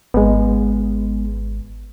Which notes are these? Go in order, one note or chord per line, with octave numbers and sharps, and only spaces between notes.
G#1 G#3 B3